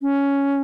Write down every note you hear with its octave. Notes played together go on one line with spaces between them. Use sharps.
C#4